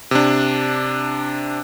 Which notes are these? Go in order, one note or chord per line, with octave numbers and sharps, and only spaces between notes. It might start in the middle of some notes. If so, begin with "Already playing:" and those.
C3 D4